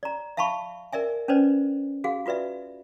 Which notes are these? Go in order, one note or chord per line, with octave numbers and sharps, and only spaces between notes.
D5 A#5
E5 F5 A5 B5 C#6
A#4 D5 E5 G#5
C#4 D4 B4 C5 D5
F#4 G#4 F5 F#5
F4 F#4 B4 D5 E5